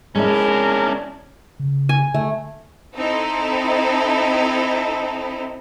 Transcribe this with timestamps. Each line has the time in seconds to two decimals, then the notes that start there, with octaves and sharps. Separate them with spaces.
0.15 G#3 C#4 D4 E4 A#4
1.60 C#3
1.89 G#5
2.14 D3 A3
2.95 C4 D#4 E4 A4